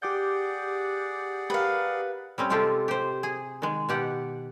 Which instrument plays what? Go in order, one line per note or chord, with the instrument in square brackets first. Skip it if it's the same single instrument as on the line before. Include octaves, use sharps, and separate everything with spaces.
[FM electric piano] G4 D6 G6 [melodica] G#4 D5 F#5
[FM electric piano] G4 A#4 [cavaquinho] B4 F5
[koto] G3 C4 C#4
C3 G#3 F4 G4 A4
G4 C5
G#4
D#3 G#3
B2 G4 F#5